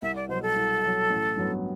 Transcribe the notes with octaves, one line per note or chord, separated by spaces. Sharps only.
C2 E5
D5
B2 F#3 C5
A4
C2
B2 F#3
A1
G2 F#3 B3